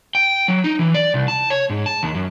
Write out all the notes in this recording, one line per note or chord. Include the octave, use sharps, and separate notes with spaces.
G5
F#3
D#4
E3
D5
C2
A5
C#5
G#2
A5
D#2
F#2